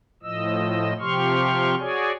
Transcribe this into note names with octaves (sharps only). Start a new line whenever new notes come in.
A2 F3 D#5 E6
C3 F3 G4 C6 C#6 F6
F#4 G#4 C#5 D5 G#5